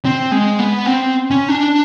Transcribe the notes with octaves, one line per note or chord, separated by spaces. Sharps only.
C4
G#3
B3
C4
C#4
D4